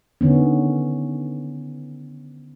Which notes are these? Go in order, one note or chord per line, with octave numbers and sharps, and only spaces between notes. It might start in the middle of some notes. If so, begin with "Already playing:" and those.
D3 D#3 B3 C#4